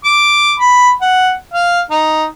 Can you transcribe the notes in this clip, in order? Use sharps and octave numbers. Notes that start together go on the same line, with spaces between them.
D6
B5
F#5
F5
D#4